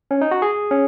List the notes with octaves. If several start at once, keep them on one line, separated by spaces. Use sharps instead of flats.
C#4
D#4
F#4
G#4
C#4